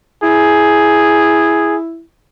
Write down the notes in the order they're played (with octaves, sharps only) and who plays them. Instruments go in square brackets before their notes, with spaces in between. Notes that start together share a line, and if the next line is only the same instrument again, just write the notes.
[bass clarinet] E4 [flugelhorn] G#4